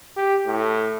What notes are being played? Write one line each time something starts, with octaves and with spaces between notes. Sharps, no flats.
G4
A2